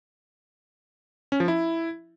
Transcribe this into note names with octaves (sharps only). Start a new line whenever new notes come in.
C#4
F3
E4